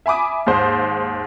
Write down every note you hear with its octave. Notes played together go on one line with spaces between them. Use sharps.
E5 G#5 B5 D6 D#6
D#2 G#2 C5